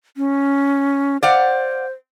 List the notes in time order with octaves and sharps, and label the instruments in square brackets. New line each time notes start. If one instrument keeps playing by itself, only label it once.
[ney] C#4
[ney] C5 [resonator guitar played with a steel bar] D5 F5 F#5